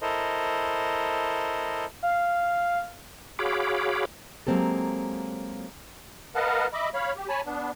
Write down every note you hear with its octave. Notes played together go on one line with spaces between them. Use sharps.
E4 A4 A#4 C5 D#5
F5
F#4 G#4 C#5 F5 B5 D6
F#3 G#3 A#3 C4 G4 A4
A#4 B4 D#5 F5 F#5 A5
D#5 E5 B5 D6
C#5 F5 B5
G4
C#5 G#5 A5 B5
B3 D4